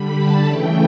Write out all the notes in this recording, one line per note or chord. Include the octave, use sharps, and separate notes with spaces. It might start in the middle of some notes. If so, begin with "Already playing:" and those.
Already playing: D3 G3 B5
A5
C#3 E3 A3 G5